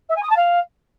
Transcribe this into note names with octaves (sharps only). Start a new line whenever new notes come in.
E5
G#5
D#6
A5
F5